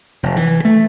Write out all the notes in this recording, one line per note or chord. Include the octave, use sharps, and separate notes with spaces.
F1
E3
A3